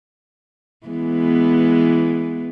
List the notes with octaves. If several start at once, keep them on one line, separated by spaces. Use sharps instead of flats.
E3 G#3 B3